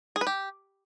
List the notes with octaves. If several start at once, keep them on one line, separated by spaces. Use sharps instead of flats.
G#4
B4
G4